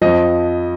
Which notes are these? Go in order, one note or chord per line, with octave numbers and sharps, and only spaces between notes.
F2 F3 D#5